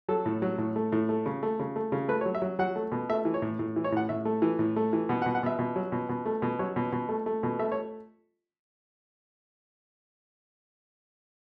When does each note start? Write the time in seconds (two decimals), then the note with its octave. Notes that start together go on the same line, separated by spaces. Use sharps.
0.08 F#3 A4
0.26 A2
0.42 F#3
0.58 A2
0.76 A3
0.92 A2
1.09 A3
1.26 C#3
1.43 A3
1.59 C#3
1.76 A3
1.92 C#3
2.08 A3 B4
2.21 C#5
2.26 F#3
2.35 E5
2.42 F#3
2.59 F#3 F#5
2.76 A3
2.92 B2
3.09 A3 E5
3.25 E3
3.34 C#5
3.42 A2
3.59 A2
3.76 E3
3.84 C#5
3.92 A2 F#5
4.09 A2 E5
4.25 A3
4.42 E3
4.59 A2
4.76 A3
4.93 E3
5.09 B2 F#5
5.22 F#5
5.26 B2
5.35 F#5
5.43 B2 E5
5.59 B2
5.76 F#3
5.92 B2
6.09 B2
6.26 A3
6.42 B2
6.59 F#3 C#5
6.76 B2
6.92 B2
7.09 A3
7.26 A3
7.43 B2
7.59 A3 E5
7.72 C#5